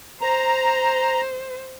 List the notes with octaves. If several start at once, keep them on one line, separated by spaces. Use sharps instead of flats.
C5 A#5